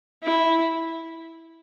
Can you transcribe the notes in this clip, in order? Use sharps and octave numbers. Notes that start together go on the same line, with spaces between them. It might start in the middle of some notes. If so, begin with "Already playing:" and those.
E4